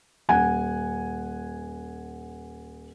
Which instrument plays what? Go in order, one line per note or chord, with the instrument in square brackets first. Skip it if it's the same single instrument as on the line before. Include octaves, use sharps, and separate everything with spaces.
[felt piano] D#1 F#5 G#5